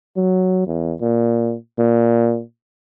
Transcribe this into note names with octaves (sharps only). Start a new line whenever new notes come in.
F#3
E2
A#2
A#2